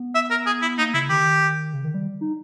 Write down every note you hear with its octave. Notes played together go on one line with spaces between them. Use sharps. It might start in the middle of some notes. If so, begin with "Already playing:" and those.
Already playing: B3
E5
A#4
G#4
E4
A#3 D#4
C#3 E4
D#3 G4
C#3
D#3
G3
D#4